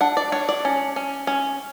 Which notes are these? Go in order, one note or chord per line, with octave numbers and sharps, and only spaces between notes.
D4 F#5
D5
D4 C#5
D5
C#4
C#4
C#4